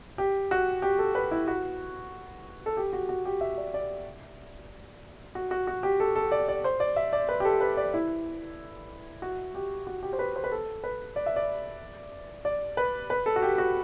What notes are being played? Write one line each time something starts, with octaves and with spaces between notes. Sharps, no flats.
G4
F#4
G4
A4
B4
E4
F#4
A4
G4
F#4
F#4
G4
E5
D5
D5
F#4
F#4
F#4
G4
A4
A4
D5
D5
C5
D5
E5
D5
B4
G4
A4
B4
D5
E4
F#4
G4
F#4
G4
C5
B4
C5
B4
A4
B4
D5
E5
D5
D5
B4
B4
A4
F#4
G4
F#4